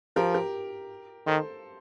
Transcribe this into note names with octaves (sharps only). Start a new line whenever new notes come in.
F3 G4 A#4
G4 A#4
D#3 A4 C5